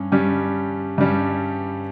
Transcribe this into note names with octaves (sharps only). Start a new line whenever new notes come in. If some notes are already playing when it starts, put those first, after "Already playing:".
Already playing: G2 C#4
G2 G3 C#4
G2 G3 C#4